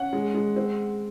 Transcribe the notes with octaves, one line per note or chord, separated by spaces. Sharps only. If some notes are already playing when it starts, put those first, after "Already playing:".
Already playing: C#4 F#5
G#3
G#3
C4